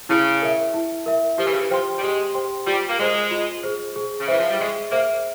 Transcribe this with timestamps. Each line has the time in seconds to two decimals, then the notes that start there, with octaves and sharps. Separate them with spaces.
0.09 C#3 E4
0.42 A#4 E5
0.74 E4
1.06 A#4 E5
1.38 F3 G4
1.46 E3
1.52 C#3
1.60 E3
1.70 F3 C5 G5 C6
1.97 G3
2.02 G#3 G4
2.34 C5 G5 C6
2.67 G3 F4
2.89 A#3
2.99 G#3 G#4 C5
3.31 F4
3.63 G#4 C5
3.96 G#4
4.20 C#3
4.28 E3 C5 E5
4.40 F3
4.50 G3
4.60 G#3 G#4
4.92 A#3 C5 E5